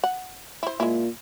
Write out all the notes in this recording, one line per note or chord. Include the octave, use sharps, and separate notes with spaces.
F#5
E4 C5
A#2 G#3 E4